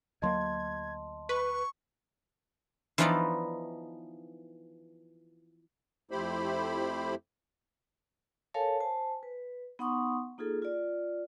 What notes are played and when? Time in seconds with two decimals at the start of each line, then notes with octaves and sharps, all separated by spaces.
0.22 D2 F#3 A#3 D#5 A5 C6 G#6
1.29 B4 C#6
2.98 E3 F3 B3 D#4 F4 D5
6.11 F2 A3 E4 G4 C5 B5
8.54 A4 A#4 C#5 F5 G#5 A5
8.80 C5 G#5 A5
9.23 B4
9.79 B3 D#4 F#5 C6 C#6 D#6
10.38 A#3 D#4 F4 G#4 A4
10.62 F4 D5